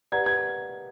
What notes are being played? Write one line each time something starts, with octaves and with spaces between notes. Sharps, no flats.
G4 B4 D5 F#5 A#5 G#6
G#6